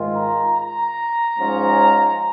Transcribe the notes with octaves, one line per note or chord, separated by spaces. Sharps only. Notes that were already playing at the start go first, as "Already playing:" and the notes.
Already playing: G#2 D#3 G#3 F4
A#5
A#5
G#2 F3 C#4